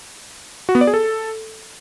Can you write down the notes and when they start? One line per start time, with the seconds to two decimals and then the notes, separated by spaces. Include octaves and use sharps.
0.69 F#4
0.75 B3
0.81 D5
0.87 G#4
0.94 A4